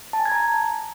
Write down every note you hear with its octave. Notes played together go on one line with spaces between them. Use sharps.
A5
G#5
G#6
A#5